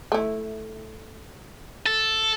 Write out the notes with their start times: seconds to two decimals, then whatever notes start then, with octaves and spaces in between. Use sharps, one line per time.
0.12 A3 E4
1.86 A4